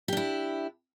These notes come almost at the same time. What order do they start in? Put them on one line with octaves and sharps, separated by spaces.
G4 D4 E4